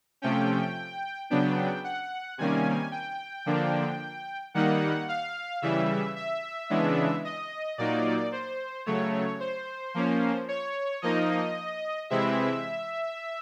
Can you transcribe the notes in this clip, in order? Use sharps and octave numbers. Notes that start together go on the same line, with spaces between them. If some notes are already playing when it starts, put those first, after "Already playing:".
C3 F3 A3 C#4 G5
C#3 F#3 B3 D4 G5
F#5
C3 D#3 G3 A#3 C#4 G#5
G5
D3 F3 A#3 D4
D#3 G3 A#3 D#4 F#5
F5
C#3 E3 G3 E5
E5
C#3 E3 G#3 B3 D4
D#5
A#2 F#3 A#3 D#4 D5
C5
C#3 F#3 A3 C#5
C5
F3 A#3 C#4
C#5
F3 A#3 D#4 D#5
C3 E3 G#3 C4 E4 E5